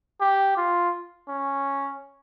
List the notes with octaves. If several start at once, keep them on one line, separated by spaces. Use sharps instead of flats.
G4
F4
C#4